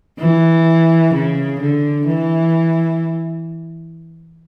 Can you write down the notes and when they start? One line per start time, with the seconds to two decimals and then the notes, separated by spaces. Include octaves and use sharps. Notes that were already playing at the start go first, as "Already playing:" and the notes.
0.19 E3
1.14 C#3
1.60 D3
2.07 E3